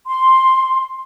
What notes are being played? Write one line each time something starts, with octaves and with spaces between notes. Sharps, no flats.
C6